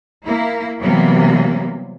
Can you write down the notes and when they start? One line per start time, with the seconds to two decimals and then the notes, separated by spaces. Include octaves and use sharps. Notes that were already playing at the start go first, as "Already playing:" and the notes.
0.24 A#3 E4
0.79 C3 E3 F#3 G3 A#3 B3